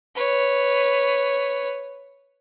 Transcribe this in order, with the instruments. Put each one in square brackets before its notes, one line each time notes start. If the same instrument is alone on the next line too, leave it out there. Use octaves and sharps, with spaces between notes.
[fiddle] B4 C#5